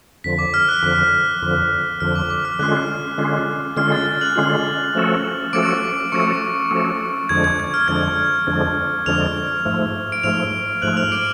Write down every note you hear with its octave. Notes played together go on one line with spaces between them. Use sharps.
F2 D3 F3 B6
D6
F6
F#6
F2 D3 F3 F#6
F2 D3 F3
F2 D3 F3 F6
D6
D6
F6
D3 G#3 C#4 F4 F#6
D3 G#3 C#4 F4
D3 G#3 C#4 F4 F6
A6
A6
F#6 F#7
D3 G#3 C#4 F4
F3 A3 C#4 F#4 A4
F3 A3 C#4 F#4 A4 D6 D7
F3 A3 C#4 F#4 A4 C#6 C#7
F3 A3 C#4 F#4 A4
F2 D3 F3 G#3 D4 G#6
G#6
G#6
F6
F2 D3 F3 G#3 D4 G#6
F2 D3 F3 G#3 D4
F2 D3 F3 G#3 D4 F6 F7
G#2 F3 A3
D7
G#2 F3 A3 F6 F7
G#2 F3 A3 F#6 F#7
F6 F7
D6 D7